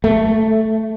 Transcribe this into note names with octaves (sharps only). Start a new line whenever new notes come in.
A3